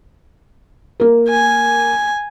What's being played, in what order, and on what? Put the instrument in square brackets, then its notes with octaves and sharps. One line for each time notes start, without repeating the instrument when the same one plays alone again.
[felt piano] A#3 A#4
[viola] G#5